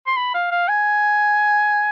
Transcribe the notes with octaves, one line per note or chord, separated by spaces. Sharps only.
C6
B5
F5
F5
G#5